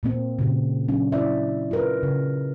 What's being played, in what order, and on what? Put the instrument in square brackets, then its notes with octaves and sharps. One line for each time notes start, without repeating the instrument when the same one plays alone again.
[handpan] A#2 A#3 C4
A#2 C#3
F#3 C#4 D4
E4 D5 E5
F4 A#4 B4
C#3